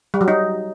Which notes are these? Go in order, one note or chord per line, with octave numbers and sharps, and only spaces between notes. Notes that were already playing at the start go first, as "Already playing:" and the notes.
G3
F#3
D#4